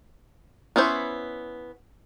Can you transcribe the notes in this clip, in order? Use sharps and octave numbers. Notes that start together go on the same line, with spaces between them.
B3 C#4 E4 C5